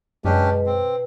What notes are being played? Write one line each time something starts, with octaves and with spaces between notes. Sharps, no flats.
F#2 B2 G#3 C#4 D4 G4
C4